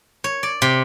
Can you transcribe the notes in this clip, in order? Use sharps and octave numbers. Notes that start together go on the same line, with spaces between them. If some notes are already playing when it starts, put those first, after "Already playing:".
C#5
D5
C3